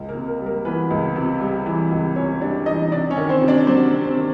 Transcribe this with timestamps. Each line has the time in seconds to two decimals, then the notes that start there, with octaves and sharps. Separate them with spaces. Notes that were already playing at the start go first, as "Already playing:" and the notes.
Already playing: C#2
0.09 A#3 A#4
0.15 C3
0.27 A#3 A#4
0.40 G3
0.46 A#3 A#4
0.65 E3 B3 B4
0.90 C#2
1.16 C3
1.41 G3
1.66 E3
1.91 C#2
2.16 C3 C#4 C#5
2.41 G3 D4 D5
2.66 E3 D#4 D#5
2.91 C3 D4 D5
3.11 C#4 C#5
3.17 D#3
3.29 C4 C5
3.42 C3
3.48 D4 D5
3.67 F#3 C4 C5
3.92 C3
4.05 C4 C5
4.17 D#3